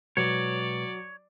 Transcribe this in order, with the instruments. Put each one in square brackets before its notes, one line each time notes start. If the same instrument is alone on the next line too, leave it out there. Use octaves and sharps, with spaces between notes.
[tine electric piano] B2 G#3 B4 [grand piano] F#3 [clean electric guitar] C#5 [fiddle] D5